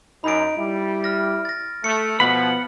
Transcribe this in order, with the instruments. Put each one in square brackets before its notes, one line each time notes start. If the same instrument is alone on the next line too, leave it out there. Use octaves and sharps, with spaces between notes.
[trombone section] F#2 [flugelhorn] D#4 [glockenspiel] B5 D7
[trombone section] G3 [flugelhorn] E4
[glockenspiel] F6 A#6
A6 A#6
[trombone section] A3 [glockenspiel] C#7
[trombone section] B2 F3 [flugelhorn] B3 [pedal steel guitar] F#5 B5